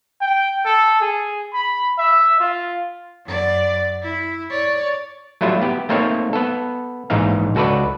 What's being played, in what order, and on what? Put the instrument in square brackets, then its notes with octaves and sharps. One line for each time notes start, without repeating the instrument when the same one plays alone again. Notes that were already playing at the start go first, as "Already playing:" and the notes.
[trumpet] G5
A4
G#4
B5
E5
F4
[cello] F#2 D5
E4
C#5 D5
[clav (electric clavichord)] F#3 G3 A3 E4 F4
B3 G4
A3 A#3 C4 D#4 C#5
B3 A4
A#1 G#2 E3 D#4 F5
C#2 F#4 A4 B4 D5